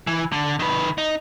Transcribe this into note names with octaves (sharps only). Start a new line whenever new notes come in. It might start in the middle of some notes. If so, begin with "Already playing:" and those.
E3
D3
D#3 B4
D#4